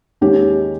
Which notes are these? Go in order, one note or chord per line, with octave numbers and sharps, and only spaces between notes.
D#2 D#3 G#3 C#4 G4